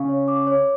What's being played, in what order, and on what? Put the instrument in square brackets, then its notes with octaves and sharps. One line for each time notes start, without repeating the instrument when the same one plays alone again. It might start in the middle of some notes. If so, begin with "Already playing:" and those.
Already playing: [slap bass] C#3 C#4 [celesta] F5 C#6
[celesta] C#5
D6
C#5